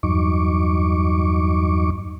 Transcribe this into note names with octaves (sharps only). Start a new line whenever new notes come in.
E2 G2 F#3 D#4 C#6 D6